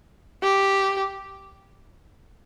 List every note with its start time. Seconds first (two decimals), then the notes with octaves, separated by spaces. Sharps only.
0.43 G4